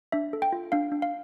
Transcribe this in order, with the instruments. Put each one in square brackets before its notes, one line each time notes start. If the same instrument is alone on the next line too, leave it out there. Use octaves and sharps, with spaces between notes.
[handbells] D4 E5
A4
G5
F4
D4 F5
D4
F5